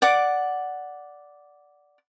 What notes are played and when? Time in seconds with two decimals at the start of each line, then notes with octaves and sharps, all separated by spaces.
0.02 D5 F#5 D6